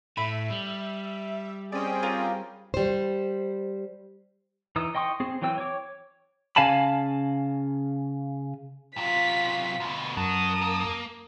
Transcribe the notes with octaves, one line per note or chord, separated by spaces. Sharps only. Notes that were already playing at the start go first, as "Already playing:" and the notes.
A2 E5 B5
G3
C4 C#4 G#4 D5 D#5 G5
F4 A#4 D5
G3 C5
E3 D#4 D#6 E6
D#5 G5 C6 C#6 D#6
C4 G#4
E3 F#3 C4 G5 E6
C#5 D6
C#3 F5 G#5 A5 B5
C3 F#3 F4 B6
D2 B2
F#2 F#3 A#4 A5 D#6
A#3